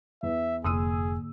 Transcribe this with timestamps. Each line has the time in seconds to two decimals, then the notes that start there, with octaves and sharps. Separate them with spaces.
0.23 E2 E5
0.64 F1 G#2 D3 A#3 G#4 D#6 E6 D#7